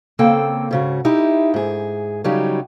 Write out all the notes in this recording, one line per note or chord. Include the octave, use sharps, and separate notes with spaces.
C#3 A#3 C4 A4 G5
G#2 C#3 F#4
D#4 E4 G4
G#2 G#4
C#3 F#3 G3 D#4 G4